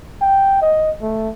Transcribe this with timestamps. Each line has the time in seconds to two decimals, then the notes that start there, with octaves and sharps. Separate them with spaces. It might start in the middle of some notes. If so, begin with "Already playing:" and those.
0.22 G5
0.62 D#5
1.02 A3